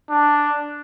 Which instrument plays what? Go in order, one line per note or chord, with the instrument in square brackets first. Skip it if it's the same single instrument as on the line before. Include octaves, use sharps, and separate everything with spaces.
[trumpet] D4